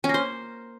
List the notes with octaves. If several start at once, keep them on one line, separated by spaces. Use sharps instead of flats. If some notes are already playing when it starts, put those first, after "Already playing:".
C#4
A#3
C5